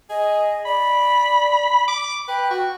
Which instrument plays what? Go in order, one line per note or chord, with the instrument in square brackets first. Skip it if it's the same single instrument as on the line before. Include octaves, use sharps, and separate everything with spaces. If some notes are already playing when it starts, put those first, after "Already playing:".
[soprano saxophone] G#4 [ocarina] D#5
[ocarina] D5 [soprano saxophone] B5
[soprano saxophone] D6
[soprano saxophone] B4 [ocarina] G5
[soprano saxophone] F#4